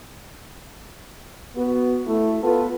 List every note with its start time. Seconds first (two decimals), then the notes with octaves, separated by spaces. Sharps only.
1.56 B3 F#4
2.06 A3 E4
2.42 B3 F4 A4 B4